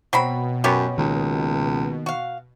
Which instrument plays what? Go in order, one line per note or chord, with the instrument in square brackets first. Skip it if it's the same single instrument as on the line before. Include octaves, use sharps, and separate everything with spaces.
[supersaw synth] B2 [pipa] F#3 C4 B5
[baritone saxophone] F#2 [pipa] B3 C#4 G4
[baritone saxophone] C#2 [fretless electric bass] D#3 A#3
[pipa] F#4 F5